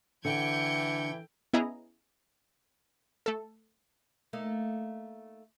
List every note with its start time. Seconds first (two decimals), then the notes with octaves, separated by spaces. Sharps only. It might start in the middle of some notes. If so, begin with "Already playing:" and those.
0.25 D3 E3 G5 G6 G#6 C#7
1.53 B3 C#4 E4 G#4 D#5 A#5
3.26 A3 A4
4.33 A3 A#3 D#4